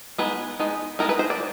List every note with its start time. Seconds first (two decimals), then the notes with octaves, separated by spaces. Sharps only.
0.18 G#3 B3 D#4 B4
0.60 G#3 B3 D#4
0.99 G#3 B3 D#4 A#4
1.09 B4
1.19 C5
1.30 D5